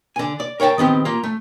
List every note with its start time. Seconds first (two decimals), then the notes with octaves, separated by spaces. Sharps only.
0.16 D3 G#5
0.40 D5
0.60 A#4 C#5 F#5 G5 A5
0.78 D#3 B3 C4 G4
1.05 A#3 F4
1.23 A3